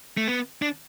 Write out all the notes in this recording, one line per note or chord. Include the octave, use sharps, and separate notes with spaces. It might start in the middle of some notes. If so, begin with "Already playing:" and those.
A3
B3
D4